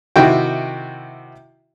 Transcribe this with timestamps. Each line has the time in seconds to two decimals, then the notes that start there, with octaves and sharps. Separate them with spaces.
0.16 C3 D#3 E4 F#4 G5